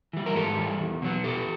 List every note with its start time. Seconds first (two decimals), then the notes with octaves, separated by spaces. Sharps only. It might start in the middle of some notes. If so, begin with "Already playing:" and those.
0.13 E3 G3
0.26 A#4
0.36 G#2 G4 A4
0.58 E3 G3
0.80 E2
1.02 B2 F#3 B3
1.24 E2 G4 A4